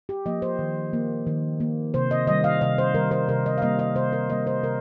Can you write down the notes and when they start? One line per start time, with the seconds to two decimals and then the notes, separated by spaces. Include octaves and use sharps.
0.09 G4
0.26 F3 A#3 D#5
0.42 C5
0.59 D#3
0.93 A#3
1.27 D#3
1.60 A#3
1.94 C3 C5
2.11 D#5
2.27 D#3 G3 D#5
2.44 F5
2.61 C3 D#5
2.78 C5
2.94 D#3 G3 A#4
3.11 C5
3.28 C3 A#4
3.46 D#5
3.58 F5
3.62 G3 A#3 D#5
3.79 D#5
3.95 C3 C5
4.13 A#4
4.30 G3 A#3 D#5
4.47 C5
4.63 C3 A#4